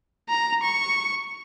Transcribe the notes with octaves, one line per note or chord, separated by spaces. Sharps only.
A#5
C#6